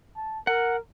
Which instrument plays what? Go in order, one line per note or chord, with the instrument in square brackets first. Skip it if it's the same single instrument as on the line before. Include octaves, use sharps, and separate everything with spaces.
[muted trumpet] A5
[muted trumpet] A#4 [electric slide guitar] F#5